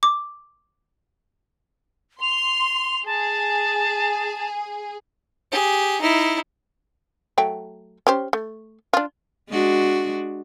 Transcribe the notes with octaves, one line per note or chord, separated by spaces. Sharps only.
D6
C6 F7
G#4 A5
G4 G#4
D#4 E4
F#3 A3 G5
C#4 G4 C5
A3
D4 F4
G#3 D4 F#4